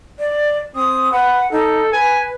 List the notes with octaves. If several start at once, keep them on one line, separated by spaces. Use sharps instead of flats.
D5
C4 D#6
B4 F#5
D#4 A4
B4 G#5